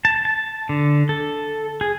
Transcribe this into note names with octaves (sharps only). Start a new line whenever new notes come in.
A5
A5
D3
A4
G#4